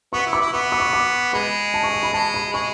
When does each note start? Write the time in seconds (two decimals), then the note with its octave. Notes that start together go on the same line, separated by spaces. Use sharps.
0.13 B3 C#6
0.27 E4
0.33 D6
0.40 E4
0.52 B3 C#6
0.72 D6
0.80 C#6
0.93 D6
1.33 G#3 B5
1.74 A5
1.83 C#6
1.94 C#6
2.03 B5
2.13 G#3 A5
2.34 B5
2.53 G#3 C#6